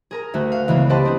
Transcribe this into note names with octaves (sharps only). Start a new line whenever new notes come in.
G#4 A#4 A#5
D2 A3 F#4
F5
C#2 E3 A#3 B3
G4 B4 C5 D#5 A5 D6
C4 D4